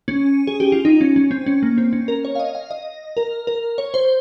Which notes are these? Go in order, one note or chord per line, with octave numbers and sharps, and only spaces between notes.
C#4
G#4
G4
F4
D#4
C#4
C#4
C4
C#4
A#3
C4
C#4
A#4
C#5
F5
D#5
F5
D#5
A#4
A#4
C#5
C5